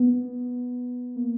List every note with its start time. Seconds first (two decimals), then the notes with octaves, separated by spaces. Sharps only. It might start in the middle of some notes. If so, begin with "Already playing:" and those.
Already playing: B3
1.16 A#3